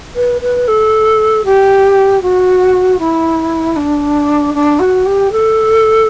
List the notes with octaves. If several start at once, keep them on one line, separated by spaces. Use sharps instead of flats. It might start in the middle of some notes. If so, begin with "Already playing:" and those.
B4
B4
A4
G4
F#4
E4
D4
D4
F#4
G4
A4